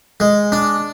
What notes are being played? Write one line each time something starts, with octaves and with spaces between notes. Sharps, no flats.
G#3
D4